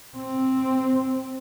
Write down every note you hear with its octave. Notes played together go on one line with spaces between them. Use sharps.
C4